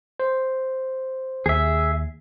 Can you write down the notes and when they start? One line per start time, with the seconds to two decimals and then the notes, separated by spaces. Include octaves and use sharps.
0.20 C5
1.46 D#2 G#4 E5